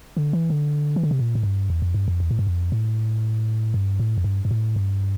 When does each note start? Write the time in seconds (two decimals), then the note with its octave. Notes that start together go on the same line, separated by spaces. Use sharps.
0.17 D3
0.33 E3
0.50 D3
0.96 E3
1.03 D3
1.11 C3
1.19 A#2
1.35 A2
1.43 G2
1.70 E2
1.82 F2
1.94 G2
2.08 F2
2.20 E2
2.31 A2
2.39 G2
2.47 F2
2.72 A2
3.74 G2
4.00 A2
4.18 F2
4.24 G2
4.45 G2
4.51 A2
4.76 G2